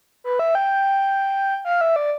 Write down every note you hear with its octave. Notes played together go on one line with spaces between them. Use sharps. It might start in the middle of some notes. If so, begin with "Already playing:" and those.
B4
E5
G5
F5
E5
D5